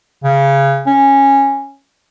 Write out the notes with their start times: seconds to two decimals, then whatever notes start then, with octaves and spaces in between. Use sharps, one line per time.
0.24 C#3
0.86 C#4